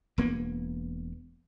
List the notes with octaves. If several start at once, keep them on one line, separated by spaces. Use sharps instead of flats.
E1 A#3 B3